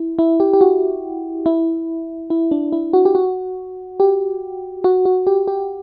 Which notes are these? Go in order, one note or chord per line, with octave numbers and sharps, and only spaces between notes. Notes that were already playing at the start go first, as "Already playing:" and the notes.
Already playing: E4
E4
G4
G4
F#4
E4
E4
D4
E4
F#4
G4
F#4
G4
F#4
F#4
G4
G4